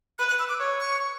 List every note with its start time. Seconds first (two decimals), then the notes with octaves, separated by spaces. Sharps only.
0.19 B4 F#6
0.29 F#6
0.39 E6
0.49 D6
0.60 C#5
0.80 C#6